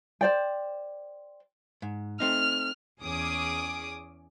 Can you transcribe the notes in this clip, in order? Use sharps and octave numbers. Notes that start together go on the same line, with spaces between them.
C5 D5 G5
G#2
A3 C4 D#4 F6
E2 C#4 G#4 D6 D#6